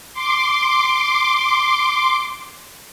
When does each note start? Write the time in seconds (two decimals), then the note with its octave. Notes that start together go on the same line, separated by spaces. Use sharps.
0.13 C6 D6